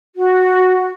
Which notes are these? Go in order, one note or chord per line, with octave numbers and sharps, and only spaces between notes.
F#4